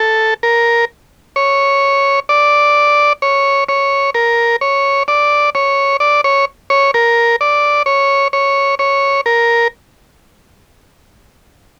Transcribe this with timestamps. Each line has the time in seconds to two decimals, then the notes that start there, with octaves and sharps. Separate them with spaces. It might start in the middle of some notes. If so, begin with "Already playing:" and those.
Already playing: A4
0.43 A#4
1.36 C#5
2.29 D5
3.22 C#5
3.69 C#5
4.14 A#4
4.61 C#5
5.08 D5
5.55 C#5
6.00 D5
6.24 C#5
6.70 C#5
6.94 A#4
7.41 D5
7.86 C#5
8.33 C#5
8.79 C#5
9.26 A#4